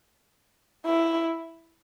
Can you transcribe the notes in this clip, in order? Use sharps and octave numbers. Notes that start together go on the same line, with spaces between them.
E4